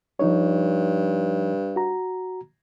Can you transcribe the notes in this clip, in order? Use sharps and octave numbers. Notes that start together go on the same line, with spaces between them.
G2 F3 D#4 C#5
F#4 A#5